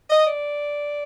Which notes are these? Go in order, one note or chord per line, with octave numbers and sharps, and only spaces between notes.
D#5
D5